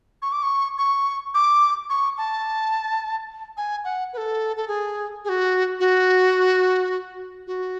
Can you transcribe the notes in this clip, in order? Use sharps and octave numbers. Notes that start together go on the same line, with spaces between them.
C#6
D6
C#6
C#6
D6
C#6
A5
G#5
F#5
B4
A4
A4
G#4
G#4
F#4
F#4
F#4